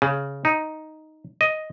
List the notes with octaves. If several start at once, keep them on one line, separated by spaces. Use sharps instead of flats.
C#3
D#4
D#5